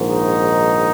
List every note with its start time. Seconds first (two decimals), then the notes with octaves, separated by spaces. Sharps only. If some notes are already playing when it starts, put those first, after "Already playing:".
Already playing: A#1 G#2 D#3
0.09 D#4